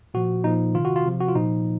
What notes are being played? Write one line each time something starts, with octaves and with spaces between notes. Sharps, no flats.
A#2 F3 F#4
A#2 F3 D#4
C3 D#3 F4
F#4
F4
C3 F3
F#4
F4
A#2 F3 D#4